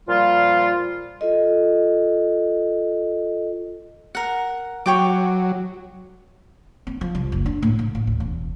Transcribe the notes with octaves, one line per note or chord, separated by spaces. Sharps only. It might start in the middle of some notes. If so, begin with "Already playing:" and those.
A#2 F3 G3 F4
F4 A4 D#5
A#4 F#5
F#3 C#5 G5 D6
C4
F3
C2
F#1
D4
A2
A2
A2
D2
E1